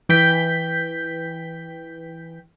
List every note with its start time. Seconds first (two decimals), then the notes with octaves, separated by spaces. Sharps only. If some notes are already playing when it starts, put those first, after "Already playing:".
0.09 E3 G5 G6 B6